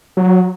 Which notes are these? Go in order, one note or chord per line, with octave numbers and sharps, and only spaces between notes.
F#3